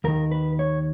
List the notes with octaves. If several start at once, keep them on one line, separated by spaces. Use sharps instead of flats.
D#2 D#3 A#4
B4
C#5